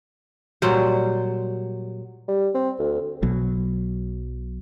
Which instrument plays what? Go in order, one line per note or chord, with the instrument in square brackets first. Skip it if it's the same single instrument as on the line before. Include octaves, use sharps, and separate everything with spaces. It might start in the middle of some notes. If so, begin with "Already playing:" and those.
[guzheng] A#2 G3 [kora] F#3 C5
[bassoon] G3
C4
D2
[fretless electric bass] B1 B2 F#3